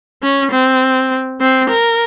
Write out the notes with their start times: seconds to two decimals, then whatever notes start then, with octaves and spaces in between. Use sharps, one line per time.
0.22 C#4
0.52 C4
1.41 C4
1.70 A#4